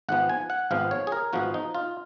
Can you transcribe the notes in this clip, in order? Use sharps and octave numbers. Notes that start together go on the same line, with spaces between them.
G#1 G#2 F3 B3 F#5
G#5
F#5
G#1 G#2 F3 B3 F5
C#5
G#4
A#4
G#1 G#2 F3 B3 F#4
D#4
F4